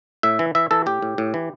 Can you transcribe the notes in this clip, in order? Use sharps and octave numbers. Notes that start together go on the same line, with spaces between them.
A2 E5
E3
E3 E5
E3 A4
A2 G4
A2
A2
E3